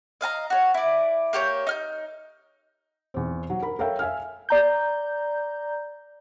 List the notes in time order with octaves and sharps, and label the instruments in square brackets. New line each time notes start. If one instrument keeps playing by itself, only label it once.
[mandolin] D#5 F5 G#5 A#5
F#4 C#5
E4 D5
A#3 G4 C#5 G6
D#4 F6 G6
[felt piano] E2 C4
F#3
A#4 B5
A4 A#4 C#5 E5 F5 G5
E5 F5 G#5 F6
[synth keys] D5 A#5 G6